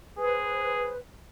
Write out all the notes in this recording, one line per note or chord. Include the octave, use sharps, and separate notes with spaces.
G#4 B4 C5